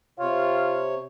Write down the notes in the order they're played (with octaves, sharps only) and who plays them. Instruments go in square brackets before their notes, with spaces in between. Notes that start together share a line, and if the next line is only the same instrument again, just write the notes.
[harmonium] C3 C#5 [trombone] F4